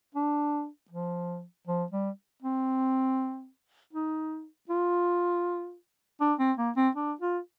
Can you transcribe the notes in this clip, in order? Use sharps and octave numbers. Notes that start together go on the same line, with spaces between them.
D4
F3
F3
G3
C4
D#4
F4
D4
C4
A#3
C4
D4
F4